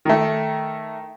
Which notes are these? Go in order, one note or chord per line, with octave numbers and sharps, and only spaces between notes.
D#3 A3